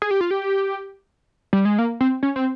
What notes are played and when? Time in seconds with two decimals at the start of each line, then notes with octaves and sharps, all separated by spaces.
0.02 G#4
0.11 G4
0.21 F4
0.31 G4
1.53 G3
1.65 G#3
1.79 A#3
2.01 C4
2.23 C#4
2.36 C4